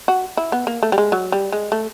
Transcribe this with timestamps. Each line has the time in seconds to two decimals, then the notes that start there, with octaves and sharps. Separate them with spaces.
0.08 F#4
0.37 E4
0.52 B3
0.67 A#3
0.83 A3
0.92 G3
0.98 G#3
1.12 F#3
1.32 G3
1.52 G#3
1.72 A3